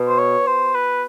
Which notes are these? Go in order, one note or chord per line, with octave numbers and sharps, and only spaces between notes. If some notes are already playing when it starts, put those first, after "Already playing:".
Already playing: B2
C5
C#5
C5
B4